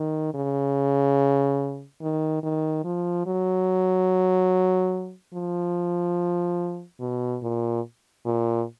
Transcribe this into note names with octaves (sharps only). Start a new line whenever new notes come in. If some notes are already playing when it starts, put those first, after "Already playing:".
Already playing: D#3
C#3
D#3
D#3
F3
F#3
F3
B2
A#2
A#2